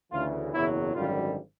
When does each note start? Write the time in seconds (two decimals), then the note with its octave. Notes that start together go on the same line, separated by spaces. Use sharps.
0.12 D2 C#3 E3 F4
0.53 F#1 E2 B2 F#3 E4
0.94 G#1 F#2 D3 G3 F4